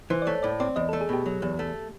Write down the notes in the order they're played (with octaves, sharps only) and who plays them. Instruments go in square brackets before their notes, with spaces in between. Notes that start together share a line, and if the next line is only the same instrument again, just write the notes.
[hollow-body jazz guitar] E3 [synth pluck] C5
[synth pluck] D5
[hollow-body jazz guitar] A3 [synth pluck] C#5
[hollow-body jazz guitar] A2 [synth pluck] D5
[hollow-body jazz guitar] C4 [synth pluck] D5
[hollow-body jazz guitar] E2 [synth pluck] D#5
[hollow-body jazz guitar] A3 [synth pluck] A4
[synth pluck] G#4
[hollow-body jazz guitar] B2 [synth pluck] G4
[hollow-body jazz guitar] F#3
E2
A3